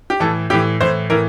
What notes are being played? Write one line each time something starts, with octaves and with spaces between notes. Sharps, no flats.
G4
A2 E3 A4
A2 E3 G4
A2 E3 C5
A2 E3 A#4